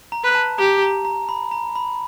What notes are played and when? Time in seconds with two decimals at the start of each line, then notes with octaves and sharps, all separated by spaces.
0.12 A#5
0.24 B4
0.35 A5
0.58 G4 A#5
0.83 A#5
1.05 A#5
1.29 B5
1.51 A#5
1.76 B5